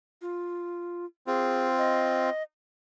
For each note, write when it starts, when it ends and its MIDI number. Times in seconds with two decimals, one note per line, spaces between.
0.22 1.05 65
1.27 2.30 60
1.27 2.30 65
1.27 1.68 68
1.78 2.43 75